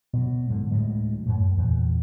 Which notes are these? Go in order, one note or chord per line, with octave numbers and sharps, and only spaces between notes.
B2 F#3
G#2 D3
D2 A2 F#3 G#3
F#2 A2
E2 A#2 E3